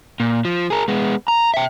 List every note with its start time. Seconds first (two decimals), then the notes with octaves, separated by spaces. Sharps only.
0.20 A#2
0.45 F3
0.70 G#4 A#4
0.88 G#3 B3
1.28 A#5
1.54 E5 G5